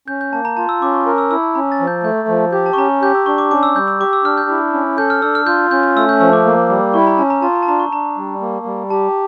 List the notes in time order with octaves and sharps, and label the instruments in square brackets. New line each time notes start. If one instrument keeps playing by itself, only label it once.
[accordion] C#4 [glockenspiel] G6
[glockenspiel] G6
[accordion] A#3 [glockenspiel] A5
[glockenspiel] A#5
[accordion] F4 [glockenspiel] A5
[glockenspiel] E6
[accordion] C#4 [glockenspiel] D6
[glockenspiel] C#6
[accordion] A#4
[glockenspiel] E6
[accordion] E4 [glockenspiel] E6
[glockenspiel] A5
[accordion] C#4 [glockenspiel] A#5
[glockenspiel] A6
[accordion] F3
[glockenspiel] G6
[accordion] A3 [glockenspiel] G6
[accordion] F3
[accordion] G4 [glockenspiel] G6
[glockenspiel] A5
C#6
[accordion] C#4 [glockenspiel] A#5
[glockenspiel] C#6
[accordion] G4 [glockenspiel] G6
[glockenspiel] E6
[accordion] D4 [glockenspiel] C#6
[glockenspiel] D6
[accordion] C#4 [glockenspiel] D6
[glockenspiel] E6
[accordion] G3 [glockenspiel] G6
[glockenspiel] E6
[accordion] G4 [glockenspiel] D6
[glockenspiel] E6
[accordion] D4 [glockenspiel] F6
[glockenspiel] G6
[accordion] E4
C#4
[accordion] A4 [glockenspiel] G6
[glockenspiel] F6
[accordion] D4 [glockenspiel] E6
[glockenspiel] F6
[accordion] F4 [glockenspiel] G6
[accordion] C#4 [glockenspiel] G6
[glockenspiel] G6
[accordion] A3 [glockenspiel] E6
[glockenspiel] G6
[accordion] F3 [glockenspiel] E6
[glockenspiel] D6
[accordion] A#3
G3
[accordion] E4 [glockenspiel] C#6
[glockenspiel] A#5
[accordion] C#4 [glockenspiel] A5
[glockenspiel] A#5
[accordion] F4 [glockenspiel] A5
[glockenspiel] A#5
A5
[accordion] D4 [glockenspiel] A#5
[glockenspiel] C#6
[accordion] D4 [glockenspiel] A#5
[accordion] G3
A#3
G3
[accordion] G4 [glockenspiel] A5